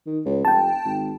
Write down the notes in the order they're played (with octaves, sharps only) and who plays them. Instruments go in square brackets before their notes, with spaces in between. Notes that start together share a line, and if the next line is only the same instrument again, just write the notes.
[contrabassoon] D#3
C#2
[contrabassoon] F1 [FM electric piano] G5 A5
[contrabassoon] G#1